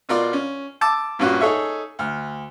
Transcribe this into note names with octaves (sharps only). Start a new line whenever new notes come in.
B2 F4 A#4 D5 C6
C#4
A5 D6 E6
G2 A#2 C#4 F4 F#4
D#4 G#4 A4 C#5 E5
D2 F6